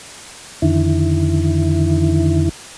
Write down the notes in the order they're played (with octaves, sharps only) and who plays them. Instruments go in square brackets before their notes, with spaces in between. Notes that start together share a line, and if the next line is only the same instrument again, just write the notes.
[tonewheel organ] F2 D3 D#3 E4